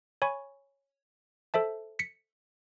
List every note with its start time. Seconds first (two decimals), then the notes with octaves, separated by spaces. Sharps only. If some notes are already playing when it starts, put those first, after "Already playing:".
0.22 C#5 G#5 B5 C#6
1.54 A4 C5 E5 A5
1.99 B6 C#7